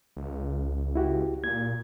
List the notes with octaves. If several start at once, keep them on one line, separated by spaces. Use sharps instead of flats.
C#2
E4 F#4 G4
A#2 G#6